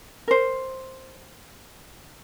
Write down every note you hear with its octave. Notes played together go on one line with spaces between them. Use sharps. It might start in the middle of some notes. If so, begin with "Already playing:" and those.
A#4 C5